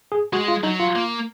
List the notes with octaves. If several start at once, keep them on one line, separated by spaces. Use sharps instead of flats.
G#4
G#3 F#4
F4
F#3 D#4
F4
A#3